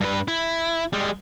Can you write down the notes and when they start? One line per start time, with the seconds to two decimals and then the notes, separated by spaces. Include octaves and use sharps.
0.01 G2 B4
0.28 E4
0.93 G3 G#3